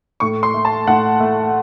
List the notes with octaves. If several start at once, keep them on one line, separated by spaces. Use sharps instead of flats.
A2 C#6
C6
A3
A5
A2 F#5
A3